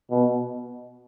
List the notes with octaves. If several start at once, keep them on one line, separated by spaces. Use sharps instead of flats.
B2